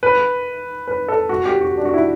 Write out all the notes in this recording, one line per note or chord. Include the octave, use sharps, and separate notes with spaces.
B4
B4
A4
F#4
G4
F#4
D4
F#4
E4